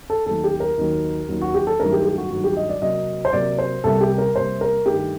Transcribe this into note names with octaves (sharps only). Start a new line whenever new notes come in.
A4
D#2 D#3 F#3 A3 A4
G4
A#4
D#2 D#3 F#3
D#2 D#3 F#3
F#4
G4
A4
G2 D#3 F#3 A3 A#4
G4
G4
F#4
G2 D#3 F#3 A3 F#4
G4
D#5
D5
C3 F#3 A#3 D#5
C5
C3 F#3 A#3 D5
C5
C2 C3 G3 A#3 A4
G4
A#4
C2 C3 G3 A#3 C5
A#4
G2 D#3 A3 G4